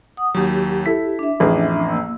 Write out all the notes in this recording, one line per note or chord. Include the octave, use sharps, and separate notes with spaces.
F#5 D#6
D#2 F#3 G4
E4 A4 B6
D4 E5
A1 F2 G#4
A#3 E6